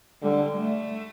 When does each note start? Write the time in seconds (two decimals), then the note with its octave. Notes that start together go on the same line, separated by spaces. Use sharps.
0.22 D3 G3
0.57 A3